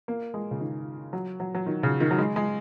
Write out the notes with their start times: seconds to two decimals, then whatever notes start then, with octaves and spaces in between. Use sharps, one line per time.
0.08 A#3
0.34 G#3
0.51 C#3
0.60 D#3
1.13 F#3
1.40 F#3
1.55 F#3
1.66 D#3
1.83 C#3
2.00 D#3
2.11 F#3
2.18 G#3
2.36 G#3